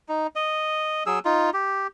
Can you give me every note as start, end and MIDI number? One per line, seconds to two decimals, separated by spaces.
0.09 0.27 63
0.36 1.03 75
1.06 1.19 54
1.06 1.19 68
1.06 1.19 88
1.25 1.50 63
1.25 1.50 65
1.54 1.87 67